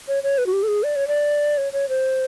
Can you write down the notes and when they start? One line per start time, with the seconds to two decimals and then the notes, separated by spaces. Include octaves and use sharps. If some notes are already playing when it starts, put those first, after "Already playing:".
0.08 C#5
0.23 C#5
0.38 B4
0.46 F#4
0.53 G4
0.63 A4
0.68 G#4
0.83 D5
0.96 C#5
1.08 D5
1.58 C#5
1.73 C#5
1.89 C5